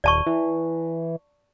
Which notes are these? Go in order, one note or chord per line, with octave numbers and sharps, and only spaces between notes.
D#1 D5 A5 C#6
E3